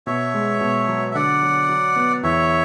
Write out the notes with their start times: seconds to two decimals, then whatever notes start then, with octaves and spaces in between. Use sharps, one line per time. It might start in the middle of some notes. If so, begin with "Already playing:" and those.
0.07 B2 C#5 E5
0.34 G#3
0.61 B2
0.88 F#3
1.11 E5
1.15 D3 D5 F#5
1.43 F#3
1.69 F#3
1.96 B3
2.23 E2 C#5 E5